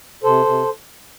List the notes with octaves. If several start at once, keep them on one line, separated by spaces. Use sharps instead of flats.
C3 A4 C5
C3